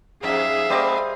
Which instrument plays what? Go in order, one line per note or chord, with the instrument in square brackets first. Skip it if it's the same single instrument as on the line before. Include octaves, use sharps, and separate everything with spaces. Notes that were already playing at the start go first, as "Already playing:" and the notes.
[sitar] F2 G#2 G3 [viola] G#4 F5 [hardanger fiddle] E5
[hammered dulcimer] G3 C5 D#5 [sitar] A3 D5